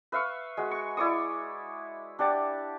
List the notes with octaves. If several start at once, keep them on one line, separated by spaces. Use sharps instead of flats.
B4 E5 F5 C#6
G#3 F#4
C#6
E4 D5 C#6 D#6
D4 G4 F#5 A5